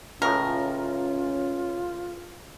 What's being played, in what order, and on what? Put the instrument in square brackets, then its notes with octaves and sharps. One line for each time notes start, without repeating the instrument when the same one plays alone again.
[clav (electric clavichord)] C#2 A2 [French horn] C#4 [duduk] F4 [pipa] A#4